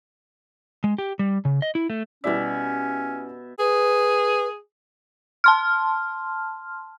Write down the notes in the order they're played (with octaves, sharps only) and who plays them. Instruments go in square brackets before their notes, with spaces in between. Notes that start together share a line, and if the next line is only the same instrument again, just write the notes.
[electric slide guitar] G#3
G4
G3
C#3
D#5
E4
A3
[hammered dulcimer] B2 E5 [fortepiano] G3 E4 D5 [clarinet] C#4
[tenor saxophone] G#4 [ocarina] B4
[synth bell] A5 C6 F6